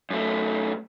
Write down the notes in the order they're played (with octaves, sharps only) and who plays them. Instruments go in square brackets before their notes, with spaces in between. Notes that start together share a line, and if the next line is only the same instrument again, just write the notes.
[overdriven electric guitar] F#2 A3